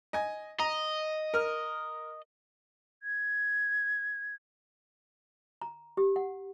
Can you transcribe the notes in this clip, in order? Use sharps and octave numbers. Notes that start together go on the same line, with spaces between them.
D#5 G#5
D#5 A#5
A#4 F6
G#6
A#5
G4
F#5